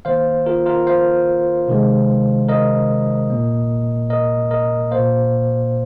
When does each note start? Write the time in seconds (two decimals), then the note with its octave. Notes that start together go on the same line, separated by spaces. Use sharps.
0.05 D#3 A#3 C5 F5
0.46 F4 A#4
0.66 F4 A#4
0.87 C5 F5
1.68 C3 D#3 G#3
2.49 A#4 D#5
3.30 A#2 A#3
4.10 A#4 D#5
4.51 A#4 D#5
4.91 A#2 A#3 C5 F5